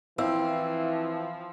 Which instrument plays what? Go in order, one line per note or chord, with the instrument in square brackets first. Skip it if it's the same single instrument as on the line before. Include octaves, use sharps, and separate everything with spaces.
[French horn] E3 [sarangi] F3 [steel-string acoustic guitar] C4 [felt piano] E4 F5 E6